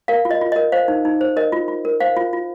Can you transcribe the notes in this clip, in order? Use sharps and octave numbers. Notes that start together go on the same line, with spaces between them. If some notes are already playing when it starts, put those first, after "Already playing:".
A#4 F5
F4
D#5
F4
D#5
A#4
C5 F5
D#4
D#4
C5
A#4 D#5
F4
F4
A#4
C5 F5
F4
F4